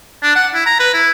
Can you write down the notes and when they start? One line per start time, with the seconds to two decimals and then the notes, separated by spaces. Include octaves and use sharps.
0.23 D4
0.35 F#5
0.54 E4
0.66 A#5
0.79 B4
0.93 E4